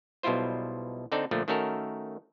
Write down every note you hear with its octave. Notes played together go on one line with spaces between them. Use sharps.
B1 B2 G3 E4 F4 C5
D3 C4 D#4 A4 D5
A#2 D3 F3 A3
D#3 A3 C#4 F#4 A4 A#4